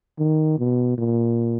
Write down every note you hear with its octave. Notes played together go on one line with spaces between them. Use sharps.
D#3
B2
A#2